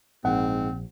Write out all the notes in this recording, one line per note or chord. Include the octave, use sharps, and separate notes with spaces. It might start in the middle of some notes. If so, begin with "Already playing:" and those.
A#1 G#2 C4 F#5